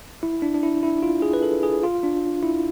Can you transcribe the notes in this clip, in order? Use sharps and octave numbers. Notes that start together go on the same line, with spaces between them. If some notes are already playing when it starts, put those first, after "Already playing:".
E4
D4
D4
E4
E4
F4
G#4
B4
A4
G#4
F4
D4
E4